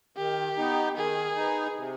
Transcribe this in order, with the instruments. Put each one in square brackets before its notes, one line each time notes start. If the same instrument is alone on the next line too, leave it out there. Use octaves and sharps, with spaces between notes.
[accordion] D#3 [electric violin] G4
[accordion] B3 D#4
[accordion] D#3 [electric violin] G#4
[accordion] B3 D#4
C3